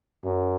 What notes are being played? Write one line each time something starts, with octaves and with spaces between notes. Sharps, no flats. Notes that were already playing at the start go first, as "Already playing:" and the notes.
F#2